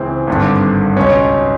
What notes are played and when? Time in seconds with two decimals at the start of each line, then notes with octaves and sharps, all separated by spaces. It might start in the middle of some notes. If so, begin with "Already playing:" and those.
Already playing: C#2 C#3 E3 C4
0.27 G#1 G2 D3
0.96 C#2 B2 C#4